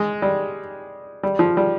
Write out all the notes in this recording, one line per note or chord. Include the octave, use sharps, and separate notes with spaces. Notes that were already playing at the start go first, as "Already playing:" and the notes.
Already playing: G#3
G3
G3
F3
G3